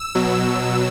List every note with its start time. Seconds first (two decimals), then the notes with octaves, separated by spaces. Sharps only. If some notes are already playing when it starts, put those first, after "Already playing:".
Already playing: E6
0.15 B2 F#3